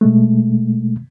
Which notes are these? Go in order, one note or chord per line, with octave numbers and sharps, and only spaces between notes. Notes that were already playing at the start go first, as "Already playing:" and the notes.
B2 G#3 A3